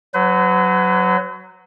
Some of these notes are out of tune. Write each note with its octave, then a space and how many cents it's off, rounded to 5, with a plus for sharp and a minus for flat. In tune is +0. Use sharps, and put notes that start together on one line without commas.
F#3 +0 B4 +45